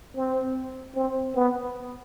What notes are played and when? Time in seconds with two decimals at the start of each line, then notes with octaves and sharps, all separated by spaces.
0.16 C4
0.96 C4
1.35 B3